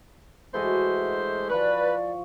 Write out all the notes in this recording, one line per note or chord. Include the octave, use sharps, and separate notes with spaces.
E3 G#3 A3 F#4 C5 D#5
F3 B4 D5 C#6